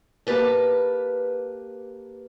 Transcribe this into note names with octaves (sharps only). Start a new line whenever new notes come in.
A#3 G4 B4 A5